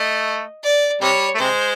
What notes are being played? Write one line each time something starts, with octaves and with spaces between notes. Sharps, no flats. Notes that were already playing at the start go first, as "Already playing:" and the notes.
Already playing: A3 D#5
D5
C3 G3 C#5
A3
C3 G#3 C5